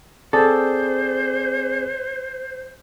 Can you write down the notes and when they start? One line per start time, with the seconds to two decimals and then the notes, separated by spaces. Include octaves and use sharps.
0.33 C4 G#4 A4 C5 D5